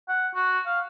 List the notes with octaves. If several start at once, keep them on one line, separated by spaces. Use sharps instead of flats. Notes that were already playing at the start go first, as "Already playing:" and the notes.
F#5
F#4
F5